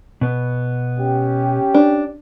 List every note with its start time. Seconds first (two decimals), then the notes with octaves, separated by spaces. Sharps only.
0.21 B2 B3
0.99 C#4 G4
1.74 D4